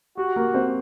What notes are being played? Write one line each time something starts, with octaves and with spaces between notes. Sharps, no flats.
F#4 G4
A#3 A#4
C4 C5